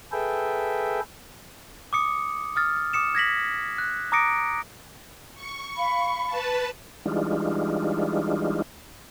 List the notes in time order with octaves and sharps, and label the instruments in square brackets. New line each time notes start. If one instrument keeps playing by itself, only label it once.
[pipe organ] G#4 A4 B4 E5 G5
[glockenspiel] D6 D#6 C#7
D#6 F6 A6
D6 D#6 C#7 E7
G#6 A#6 B6 F#7
F#6
A#5 D6 D#6 A#6 C#7 D7
[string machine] C#6
[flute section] F5 B5
[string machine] B4 A5
[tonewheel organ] E3 G3 G#3 D4 D#4 F4